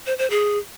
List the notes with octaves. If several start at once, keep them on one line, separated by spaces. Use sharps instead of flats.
C5
C5
G#4